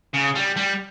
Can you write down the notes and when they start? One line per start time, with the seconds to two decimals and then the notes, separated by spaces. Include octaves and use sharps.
0.14 C#3
0.35 G3
0.56 G3